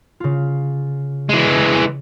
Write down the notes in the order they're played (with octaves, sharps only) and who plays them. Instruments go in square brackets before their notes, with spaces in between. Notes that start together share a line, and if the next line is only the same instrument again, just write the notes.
[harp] C#3 F4
[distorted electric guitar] E3 G#3